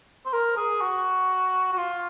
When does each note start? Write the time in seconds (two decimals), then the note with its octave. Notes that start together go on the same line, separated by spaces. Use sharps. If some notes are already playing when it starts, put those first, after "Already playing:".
0.26 C5
0.33 A#4
0.57 G#4
0.81 F#4
1.73 F#4
1.78 F4